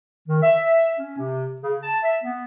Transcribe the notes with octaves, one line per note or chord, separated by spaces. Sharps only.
D#3
E5
C#4
C3
C#3
A5
E5
B3